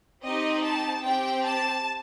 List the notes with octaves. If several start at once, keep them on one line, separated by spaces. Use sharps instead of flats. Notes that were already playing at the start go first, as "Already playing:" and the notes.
C4 D#4 G4 D#5
A5
C4 G4 G5
A5